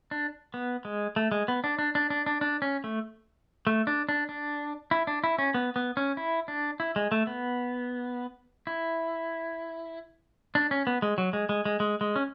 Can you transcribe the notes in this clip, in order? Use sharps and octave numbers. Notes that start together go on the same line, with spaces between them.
D4
B3
G#3
A3
G#3
B3
D4
D4
D4
D4
D4
D4
C#4
A3
A3
D4
D4
D4
E4
D4
E4
C#4
B3
B3
C#4
E4
D4
E4
G#3
A3
B3
E4
D4
C#4
B3
G#3
F#3
G#3
G#3
G#3
G#3
G#3
C#4